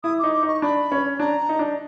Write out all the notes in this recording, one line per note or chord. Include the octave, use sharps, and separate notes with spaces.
E4 D#6
D#4 D6
D6
D#4
C#6
D4 B5
C#4
D4 A#5
D#4
D4